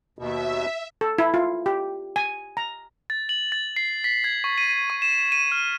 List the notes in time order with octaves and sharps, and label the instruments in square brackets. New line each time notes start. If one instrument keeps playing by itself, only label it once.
[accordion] D#2 B2 [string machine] E5
[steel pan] A4
E4
F4
G4
G#5
A#5
[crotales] A6
F#7
A6
C7
B6
G#6
C#6
D#7
C#6
E7
D#7
F6